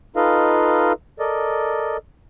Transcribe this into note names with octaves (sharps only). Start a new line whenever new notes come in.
D#4 F4 A4 B4 D#5 F5
A4 A#4 D5 D#5